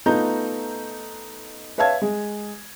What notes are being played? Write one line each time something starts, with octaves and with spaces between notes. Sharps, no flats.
A3 B3 D#4 F4 A#5 G6
B4 C#5 E5 F5 A5 G#6
G#3